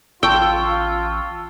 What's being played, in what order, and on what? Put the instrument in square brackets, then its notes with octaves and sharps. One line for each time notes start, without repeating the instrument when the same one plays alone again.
[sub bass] A1 [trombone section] F4 [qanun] G5 [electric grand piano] A5 C#6 E6